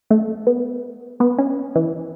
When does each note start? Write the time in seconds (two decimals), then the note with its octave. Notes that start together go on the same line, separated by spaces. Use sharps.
0.11 A3
0.47 B3
1.20 B3
1.38 C#4
1.76 E3